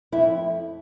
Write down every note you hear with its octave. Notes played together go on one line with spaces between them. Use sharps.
F2 E4